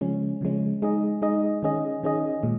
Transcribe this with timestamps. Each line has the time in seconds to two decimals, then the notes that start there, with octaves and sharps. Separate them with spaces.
0.01 C#3 F3 G#3 C#4
0.41 C#3 F3 G#3 C#4
0.82 G#3 D#4 G#4 D#5
1.22 G#3 D#4 G#4 D#5
1.63 D#3 C#4 G#4 D#5
2.03 D#3 C#4 G#4 D#5
2.43 A#2 G#3